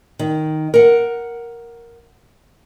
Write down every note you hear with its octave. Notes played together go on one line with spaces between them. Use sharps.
D#3
A#4 F#5